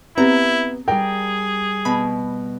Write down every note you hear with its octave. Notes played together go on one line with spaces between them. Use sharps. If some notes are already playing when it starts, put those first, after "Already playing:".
B3 C4 E4 G4 A#5
G3 G#4 A#4 G5
B2 B5